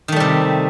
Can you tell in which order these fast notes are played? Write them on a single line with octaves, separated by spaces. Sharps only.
D#3 A3 G3 C3